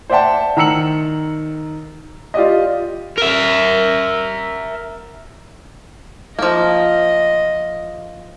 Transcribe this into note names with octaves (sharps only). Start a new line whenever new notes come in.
C5 D5 E5 F#5 G5 A5
D#3 A#5 E6 C#7 F#7
F4 G4 D5 D#5
A#4 E5
F3 A#3 D#5